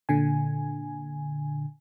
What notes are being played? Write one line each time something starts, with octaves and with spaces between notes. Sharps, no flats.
A#2 D3 G#5